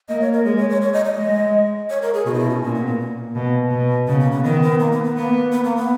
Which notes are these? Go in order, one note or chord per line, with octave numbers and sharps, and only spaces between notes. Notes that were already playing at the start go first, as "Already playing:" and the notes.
A#3 D#5
C#5
A#4
G#3 G#4
C#5
C#5
C#5
D#5
D#5
G#3
C#5
A#4
G#4
B2 F#4
D#4
E4
C#4
A#2 C#4
B3
B3
A#3
B2
B2
C#3 B3
A#3
B3
D#3 B3
B3
A#3
B3
B3
A#3 B3
B3
A#3
B3